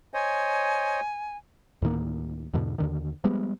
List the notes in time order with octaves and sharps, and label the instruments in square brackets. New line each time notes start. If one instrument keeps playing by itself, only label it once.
[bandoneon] C5 C#5 D#5 [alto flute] G#5
[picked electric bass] D2 A2 D#3 A#3
E2 G#2 B2 D3
D#2 D3 D#3
F3 G3 G#3 B3